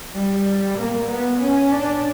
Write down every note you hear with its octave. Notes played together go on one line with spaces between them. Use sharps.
G3
A#3
B3
C#4
D4